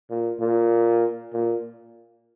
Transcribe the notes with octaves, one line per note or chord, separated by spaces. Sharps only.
A#2
A#2
A#2